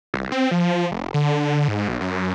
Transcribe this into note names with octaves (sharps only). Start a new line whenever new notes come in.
C2
C4
F3
F1
D3
D3
G#2
B1
F#2